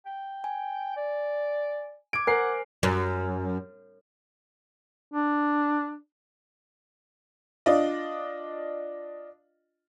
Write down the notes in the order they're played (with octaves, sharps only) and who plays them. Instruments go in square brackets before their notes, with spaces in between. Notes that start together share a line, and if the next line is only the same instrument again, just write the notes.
[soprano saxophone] G5
[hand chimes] G#5
[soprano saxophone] D5
[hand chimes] D6 G#6 [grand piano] D7
[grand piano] A#4 C7 [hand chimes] C5 G#5 [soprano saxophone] F#5
[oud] F#2
[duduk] D4
[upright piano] D4 F4 D5 D#5